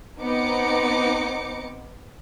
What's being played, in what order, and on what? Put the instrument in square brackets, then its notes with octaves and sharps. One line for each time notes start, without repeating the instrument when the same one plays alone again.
[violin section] B3 C4 D#4 D6 C#7